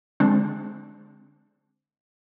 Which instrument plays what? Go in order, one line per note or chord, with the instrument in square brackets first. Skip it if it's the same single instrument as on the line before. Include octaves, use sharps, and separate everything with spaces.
[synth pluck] D3 G#3 C4 D4